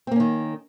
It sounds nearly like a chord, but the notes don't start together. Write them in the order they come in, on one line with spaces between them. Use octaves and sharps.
C4 A#3 C#4 D#3